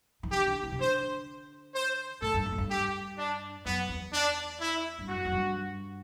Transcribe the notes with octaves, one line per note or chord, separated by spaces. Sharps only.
E3
D3 G4
D3
E3
C3
D3 C5
C5
A2 A4
G2
F#2
A2
G2
G4
D4
F#2 B3
E2
D4
E4
G2
F#2 F#4
F#2
G2